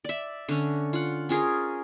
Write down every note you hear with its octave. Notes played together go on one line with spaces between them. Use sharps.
D5 E5
D3 C#4
F4 F#5
C#4 F4 G#4 A#4